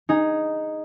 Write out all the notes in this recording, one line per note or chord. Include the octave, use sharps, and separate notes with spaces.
D#4 G#4